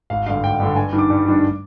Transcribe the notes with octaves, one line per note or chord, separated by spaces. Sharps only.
G#1 F5
G2 D3 F5
G#1 G5
G2 D3
G2 G#5
D#3 G3 D4
D6
G2
D#3 G3 D4